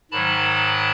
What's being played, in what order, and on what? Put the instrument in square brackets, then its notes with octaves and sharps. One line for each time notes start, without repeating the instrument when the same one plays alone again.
[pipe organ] G#2 D#3 F#3 A5 B5